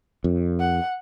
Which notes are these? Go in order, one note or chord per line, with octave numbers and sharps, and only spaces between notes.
F2
F#5